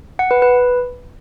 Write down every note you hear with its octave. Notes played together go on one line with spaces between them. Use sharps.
F#5
B4
B4